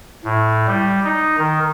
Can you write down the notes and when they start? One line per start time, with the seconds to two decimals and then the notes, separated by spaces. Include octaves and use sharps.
0.25 A2
0.67 G3
1.04 D#4
1.38 D#3